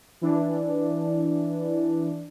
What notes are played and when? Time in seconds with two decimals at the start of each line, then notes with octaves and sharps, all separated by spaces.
0.21 E3 D4